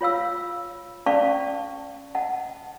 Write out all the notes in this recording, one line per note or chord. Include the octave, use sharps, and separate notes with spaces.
F4 C#5 F5 E6
C#4 D5 F5 A5 C#6
D#5 F#5 A5